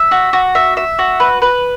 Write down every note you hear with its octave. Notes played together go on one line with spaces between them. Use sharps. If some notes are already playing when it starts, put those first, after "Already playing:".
Already playing: E5
F#4
F#4
E5
E5
F#4
B4
B4